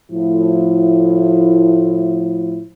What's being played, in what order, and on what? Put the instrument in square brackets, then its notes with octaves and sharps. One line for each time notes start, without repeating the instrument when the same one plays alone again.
[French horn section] A2 F3 E4